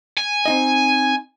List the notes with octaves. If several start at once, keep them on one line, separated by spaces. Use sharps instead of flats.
G#5
C4 D#4 D#5